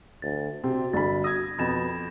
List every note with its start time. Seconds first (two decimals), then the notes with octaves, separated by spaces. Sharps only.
0.22 D2 A6
0.64 C3 C4 F#4
0.93 G1 D3 B5 A6
1.24 D#6 E6 G#6 A#6
1.59 F2 B2 B5 A6 E7